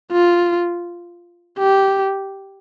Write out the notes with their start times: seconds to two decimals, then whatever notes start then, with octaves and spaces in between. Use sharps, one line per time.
0.12 F4
1.58 G4